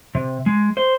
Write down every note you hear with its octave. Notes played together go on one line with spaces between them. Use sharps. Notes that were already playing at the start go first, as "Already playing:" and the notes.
C3
G#3
C5